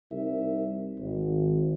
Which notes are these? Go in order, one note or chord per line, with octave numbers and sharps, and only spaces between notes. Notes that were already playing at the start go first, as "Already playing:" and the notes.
C2 C3 D#4 A#4 E5
G#1